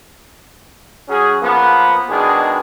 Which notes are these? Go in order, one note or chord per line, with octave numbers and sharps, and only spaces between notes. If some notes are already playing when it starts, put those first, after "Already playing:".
F#3 C#4 G#4
F3 A#3 B3
B2 D#3 G#3 D4 G#4